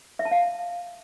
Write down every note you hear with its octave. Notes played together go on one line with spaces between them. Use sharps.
E5
A5
F5